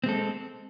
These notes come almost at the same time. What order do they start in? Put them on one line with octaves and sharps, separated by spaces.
C4 G#3 A4